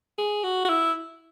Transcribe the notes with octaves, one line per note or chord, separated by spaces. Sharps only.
G#4
F#4
F#4
E4